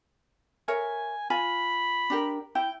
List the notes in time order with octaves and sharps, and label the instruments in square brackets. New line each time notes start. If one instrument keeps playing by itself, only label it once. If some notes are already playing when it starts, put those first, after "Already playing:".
[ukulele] A#4 C#5 E5 [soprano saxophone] G#5
[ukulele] F4 G#5 [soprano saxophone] B5
[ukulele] D4 G4 A#4
[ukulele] E4 [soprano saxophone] G5